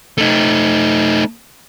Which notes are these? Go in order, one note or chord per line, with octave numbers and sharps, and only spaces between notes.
A3 D#4